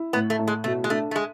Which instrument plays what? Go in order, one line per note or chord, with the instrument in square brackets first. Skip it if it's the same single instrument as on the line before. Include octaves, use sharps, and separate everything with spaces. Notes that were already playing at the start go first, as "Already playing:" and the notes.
Already playing: [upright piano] E4
[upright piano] A2 [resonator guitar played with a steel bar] B3
[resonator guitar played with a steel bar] A3
[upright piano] A2
[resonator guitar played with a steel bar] G#3
[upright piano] B2 [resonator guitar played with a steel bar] A3
[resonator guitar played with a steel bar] G#3
[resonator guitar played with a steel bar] A3 [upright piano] D4
[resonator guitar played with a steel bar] A3
G#3